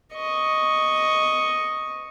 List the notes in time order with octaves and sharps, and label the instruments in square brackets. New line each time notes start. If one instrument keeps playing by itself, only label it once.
[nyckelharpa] D#5 C#6